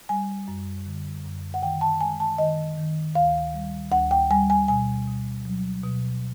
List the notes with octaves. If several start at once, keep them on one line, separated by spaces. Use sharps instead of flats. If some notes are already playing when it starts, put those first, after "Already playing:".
G3 G#5
F#2
D3
F#2
F#5
D#3 G5
A5
G#3 G#5
A5
D#3 D#5
D#3
D2 F5
G3
D2 F#5
G5
G3 G#5
G#5
B2 G#5
B2
F#3
B2